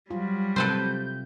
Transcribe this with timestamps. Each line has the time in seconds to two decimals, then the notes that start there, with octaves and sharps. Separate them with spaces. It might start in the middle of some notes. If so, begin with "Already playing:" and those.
0.11 F#3 G3 F4
0.56 C3 A4 B4 C5 G6